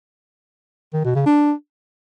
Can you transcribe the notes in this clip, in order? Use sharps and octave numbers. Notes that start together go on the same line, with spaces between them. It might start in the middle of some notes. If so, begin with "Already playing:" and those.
D#3
B2
C#3
D4